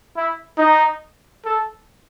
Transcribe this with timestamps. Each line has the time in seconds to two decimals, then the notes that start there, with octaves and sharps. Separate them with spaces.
0.16 E4
0.58 D#4
1.45 A4